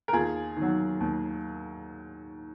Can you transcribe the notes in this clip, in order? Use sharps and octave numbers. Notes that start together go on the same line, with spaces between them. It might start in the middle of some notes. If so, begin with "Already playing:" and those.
A#4
D#2 F4 G#4
D#3 F#3
D#2